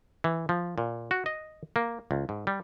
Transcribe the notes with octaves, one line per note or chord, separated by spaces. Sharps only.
E3
F3
A#2
F#4
D#5
A#3
C#2
G#2
G3